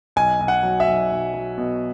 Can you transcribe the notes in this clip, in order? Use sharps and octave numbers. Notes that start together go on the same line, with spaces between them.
B1 G#5
B1
F#5
F#3
E5
B1
B1
F#3
B2